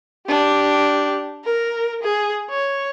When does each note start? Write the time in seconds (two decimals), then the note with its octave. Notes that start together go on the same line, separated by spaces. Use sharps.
0.27 D4 G4
1.44 A#4
2.03 G#4
2.50 C#5